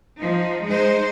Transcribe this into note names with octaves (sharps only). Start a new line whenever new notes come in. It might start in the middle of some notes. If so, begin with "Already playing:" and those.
F3 D#4
G#3 D#4 C5